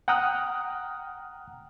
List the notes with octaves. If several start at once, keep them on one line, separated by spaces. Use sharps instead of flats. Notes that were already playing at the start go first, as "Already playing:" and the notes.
F#5 G5 A#5 D#6 F6 F#6